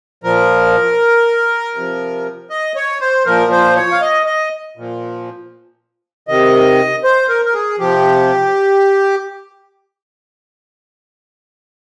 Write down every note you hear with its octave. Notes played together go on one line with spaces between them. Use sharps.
A#2 F3 A#4
C3 F3
D#5
C#5
C5
A#2 F3 A#4
C5
C#5
F5
D#5
D#5
A#2 F3
C3 D#3 D#5
C5
A#4
A#4
G#4
C3 F3 G4